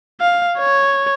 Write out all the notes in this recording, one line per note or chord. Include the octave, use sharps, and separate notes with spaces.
F5
C#5